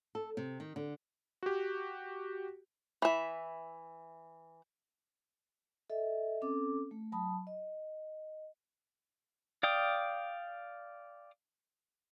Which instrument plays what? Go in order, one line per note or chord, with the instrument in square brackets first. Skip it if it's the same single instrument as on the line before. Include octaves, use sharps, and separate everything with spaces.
[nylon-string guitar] A4
C3
D#3
D3
[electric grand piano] F#4 G4
[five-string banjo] E3 E5
[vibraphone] A4 D#5 E5
C4 C#4 A4 D6
A3
F#3 A5 B5 D#6
D#5
[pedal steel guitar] D5 F5 G5 D#6